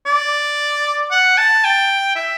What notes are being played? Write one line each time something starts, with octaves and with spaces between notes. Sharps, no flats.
D5
F#5
A5
G5
E5